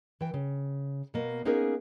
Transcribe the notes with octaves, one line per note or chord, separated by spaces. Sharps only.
E3 G5
C#3
B2 A#3
A#3 B3 C#4 D#4 G#4 A#4